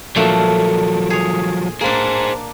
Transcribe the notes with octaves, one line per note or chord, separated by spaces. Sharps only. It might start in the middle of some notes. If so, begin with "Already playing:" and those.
A#2 F3 F#3 A3 D4
G#4 C#5
A#3 D4 G#4 C5